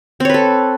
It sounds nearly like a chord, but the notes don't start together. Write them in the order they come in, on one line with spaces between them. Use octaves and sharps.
C4 C#5 B4 A4